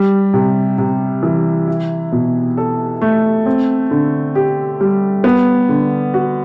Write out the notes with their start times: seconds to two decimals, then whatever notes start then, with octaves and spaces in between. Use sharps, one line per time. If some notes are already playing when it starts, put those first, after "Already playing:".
Already playing: G3
0.34 C3
0.78 C3
1.23 E3
1.67 E4
2.12 B2
2.57 A4
3.01 A3
3.46 C4
3.91 D3
4.35 G4
4.81 G3
5.24 B3
5.69 D3
6.14 F#4